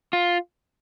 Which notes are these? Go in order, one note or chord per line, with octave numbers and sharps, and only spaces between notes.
F4